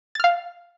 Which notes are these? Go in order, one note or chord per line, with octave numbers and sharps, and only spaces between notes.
F5 F6 A6